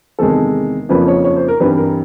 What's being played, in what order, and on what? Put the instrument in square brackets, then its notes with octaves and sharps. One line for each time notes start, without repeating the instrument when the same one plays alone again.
[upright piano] E2 C3 D#3 G#3 A4
F2 C#3 F3 A#3 C#4 B4
C#5
C#5
C5
A#4
G2 E3 G3 C4 B4
A#4